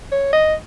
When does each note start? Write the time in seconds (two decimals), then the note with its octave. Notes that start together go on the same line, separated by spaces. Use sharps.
0.12 C#5
0.33 D#5